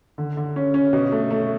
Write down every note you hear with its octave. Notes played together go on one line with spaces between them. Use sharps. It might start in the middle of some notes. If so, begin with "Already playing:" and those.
D3
D3
C#4
C#4
B2
A3
A3